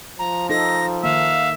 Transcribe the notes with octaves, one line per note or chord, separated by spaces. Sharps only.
F3 A#5
D#4 A4 A#6
D#3 A#3 E5 F5